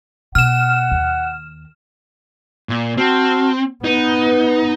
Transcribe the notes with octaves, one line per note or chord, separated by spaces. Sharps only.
B2 F#5 F6 E7
D#2
A#2
C4 F#4 A5 F6
B3 D#4 B4